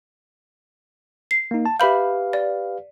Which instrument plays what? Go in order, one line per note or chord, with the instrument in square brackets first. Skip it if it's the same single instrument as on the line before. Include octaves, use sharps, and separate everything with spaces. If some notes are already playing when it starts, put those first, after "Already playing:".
[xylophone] C7
[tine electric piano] A#3 D#4
A5
[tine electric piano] G4 B4 F5 [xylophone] E5 B5 G6
[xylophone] D5